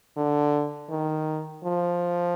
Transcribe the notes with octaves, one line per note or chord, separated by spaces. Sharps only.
D3
D#3
F3